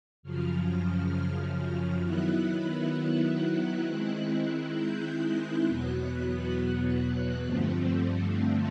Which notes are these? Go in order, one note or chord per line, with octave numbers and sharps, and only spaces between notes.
F#2 C#3 F3 F6
D#3 F#3 B3 E4 F#6
F#6
F#6
D#3 G#3 C4 E4
G6
F#6
E2 B2 F#3 B3 F#6
F#6
G2 D3 F3 A3 C4